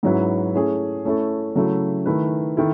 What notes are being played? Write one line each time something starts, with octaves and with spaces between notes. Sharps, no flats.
G#2 F#3 C#4 E4 B4
A3 C#4 E4 G#4
A3 C#4 E4 A4
C#3 F#3 A3 E4
D#3 A3 E4 B4
D#3 E4 A4